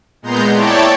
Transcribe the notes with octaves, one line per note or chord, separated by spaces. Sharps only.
A#2 G#3 B3 A#5 C6 G6
E4 C#5 D5 G5 A5